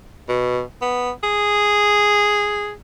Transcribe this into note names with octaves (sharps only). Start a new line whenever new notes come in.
B2
B3
G#4